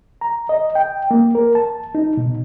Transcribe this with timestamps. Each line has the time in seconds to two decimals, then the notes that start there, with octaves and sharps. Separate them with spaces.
0.21 A#5
0.49 D#5
0.75 G5
1.11 A#3
1.35 A#4
1.55 A5
1.95 D#4
2.17 B2